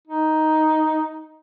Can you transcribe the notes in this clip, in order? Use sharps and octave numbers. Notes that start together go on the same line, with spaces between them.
D#4